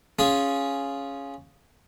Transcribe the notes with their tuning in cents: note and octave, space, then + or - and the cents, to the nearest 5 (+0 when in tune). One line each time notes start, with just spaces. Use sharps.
C#4 +0 F4 +0 G#4 +0